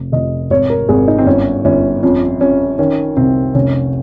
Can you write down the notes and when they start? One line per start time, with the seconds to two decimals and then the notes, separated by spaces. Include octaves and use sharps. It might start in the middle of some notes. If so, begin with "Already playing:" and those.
Already playing: F1
0.12 F1 D#5
0.50 G#1 C#5
0.70 A#4
0.89 G#1 G#4
1.07 D#4
1.18 C4
1.26 G1 C#4
1.65 G1 C#4
2.03 F2 C#4
2.41 F2 C#4
2.79 D#3 C#4
3.17 C2 C4
3.55 F1 C#4